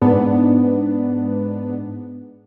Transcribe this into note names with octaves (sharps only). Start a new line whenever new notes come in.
G#2 B3 D4